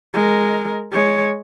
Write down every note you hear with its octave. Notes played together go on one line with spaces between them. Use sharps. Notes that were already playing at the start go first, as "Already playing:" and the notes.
G#3 A#4
G#3 C#5